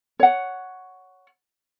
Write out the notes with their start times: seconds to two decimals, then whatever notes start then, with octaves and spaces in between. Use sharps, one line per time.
0.20 C#5 F#5